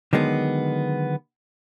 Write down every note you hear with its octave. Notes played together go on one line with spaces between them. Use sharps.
D3 D#3 F#3 G#3 B3